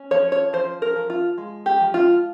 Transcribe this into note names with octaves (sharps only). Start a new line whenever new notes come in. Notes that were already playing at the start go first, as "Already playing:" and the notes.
Already playing: C#4
F3 C#5
C#5
F3 C5
A#4
F3
F4
G#3
G4
F3
F4